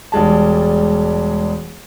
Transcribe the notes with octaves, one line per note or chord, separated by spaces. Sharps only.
E1 G3 G#3 A5